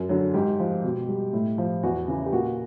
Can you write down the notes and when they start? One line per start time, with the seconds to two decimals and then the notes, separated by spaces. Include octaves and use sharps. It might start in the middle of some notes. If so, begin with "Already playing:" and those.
Already playing: F#2
0.09 D3 F#3
0.34 G#2 G4
0.60 F3
0.84 B2
1.09 G3
1.33 A2
1.58 F3
1.83 E2 F#4
2.08 C#3 E3
2.26 G4
2.33 A#2 F#4